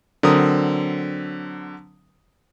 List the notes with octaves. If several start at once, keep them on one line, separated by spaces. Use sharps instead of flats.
D3 F#3 C4 A#4 D#6